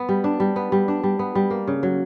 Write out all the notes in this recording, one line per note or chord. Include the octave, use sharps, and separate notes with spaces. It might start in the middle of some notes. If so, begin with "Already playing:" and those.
Already playing: B3
G3
D4
G3
B3
G3
D4
G3
B3
G3
A#3
C#3
F#3